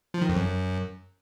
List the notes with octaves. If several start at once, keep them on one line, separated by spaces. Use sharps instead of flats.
F3
D#3
F2
F#2